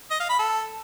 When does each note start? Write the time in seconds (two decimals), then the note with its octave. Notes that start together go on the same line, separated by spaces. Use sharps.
0.10 D#5
0.20 F5
0.29 B5
0.39 A4